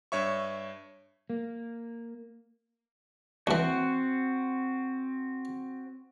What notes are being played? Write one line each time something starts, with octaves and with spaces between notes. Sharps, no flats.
G2 C#5 E5 C#6
A#3
D2 E3 C4 F#4